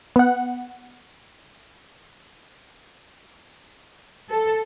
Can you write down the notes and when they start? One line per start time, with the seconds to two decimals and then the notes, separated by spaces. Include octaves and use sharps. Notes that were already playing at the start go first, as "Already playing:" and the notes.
0.16 B3 F#5
4.31 A4